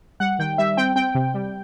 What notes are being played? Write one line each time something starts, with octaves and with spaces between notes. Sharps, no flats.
G3 F#5
D#3 G5
G3 E5
C4 G5
C4 G5
C3
G3